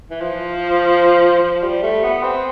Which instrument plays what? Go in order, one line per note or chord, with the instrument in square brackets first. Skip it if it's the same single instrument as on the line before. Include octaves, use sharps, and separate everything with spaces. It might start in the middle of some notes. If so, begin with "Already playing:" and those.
[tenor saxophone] E3
F3
F3
G3
A3
B3
C4